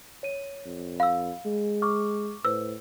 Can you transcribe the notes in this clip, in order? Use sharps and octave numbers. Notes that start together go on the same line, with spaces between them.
C#5 D#7
F2
F5 B5 E6
G#3
C#6 D6 F6
A2 B4 C5 E6